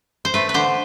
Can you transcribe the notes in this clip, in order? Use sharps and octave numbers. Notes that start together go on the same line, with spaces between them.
C5
A3 B4
B4
D3 C5